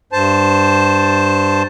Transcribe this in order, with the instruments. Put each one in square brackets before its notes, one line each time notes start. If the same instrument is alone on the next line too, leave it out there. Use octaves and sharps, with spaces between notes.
[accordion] G2 C5 A5